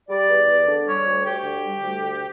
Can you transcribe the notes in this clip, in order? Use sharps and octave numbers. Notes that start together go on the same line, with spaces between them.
G3 D5
E2
E2
D3
G3 C#5
D2
D2 G4
D3
G3
D2
D2